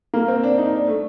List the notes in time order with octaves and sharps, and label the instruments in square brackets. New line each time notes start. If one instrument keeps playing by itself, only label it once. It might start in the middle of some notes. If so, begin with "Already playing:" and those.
[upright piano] A#3
C4
D4
D#4
D4
A3